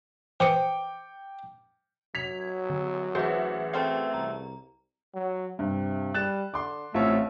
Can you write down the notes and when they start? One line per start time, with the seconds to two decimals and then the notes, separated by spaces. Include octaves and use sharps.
0.40 E3 C5 G5 D6 D#6 C#7
2.15 F#3 G#6 B6 F7
2.70 D3
3.15 A1 F#4 G#4 B4 C5 E5
3.73 A3 C4 F5
4.14 C2 A#5
5.14 F#3
5.59 G2 C3
6.14 G3 F#6 A6 E7
6.54 D3 C6 D6
6.94 A1 A3 C4 F4 C#5